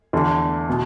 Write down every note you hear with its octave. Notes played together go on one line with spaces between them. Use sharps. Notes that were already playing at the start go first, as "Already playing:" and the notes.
E2 D3
B2